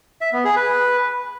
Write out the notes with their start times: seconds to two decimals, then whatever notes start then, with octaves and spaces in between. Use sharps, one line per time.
0.21 E5
0.33 B3
0.45 G#4
0.57 B4